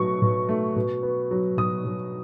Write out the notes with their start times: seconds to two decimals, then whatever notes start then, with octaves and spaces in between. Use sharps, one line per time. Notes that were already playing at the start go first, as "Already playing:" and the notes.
Already playing: B2 F#3 A3 C#6
0.22 B2
0.49 A3
0.76 B2
1.03 B3
1.31 F#3
1.57 B2 D#6
1.85 B2